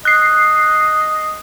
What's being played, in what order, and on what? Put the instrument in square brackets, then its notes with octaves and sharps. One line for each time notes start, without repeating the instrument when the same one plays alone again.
[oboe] D#5 [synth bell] F#6 C7